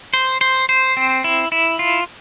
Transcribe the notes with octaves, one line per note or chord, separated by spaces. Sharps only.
C5
C5
C5
C4
E4
E4
F4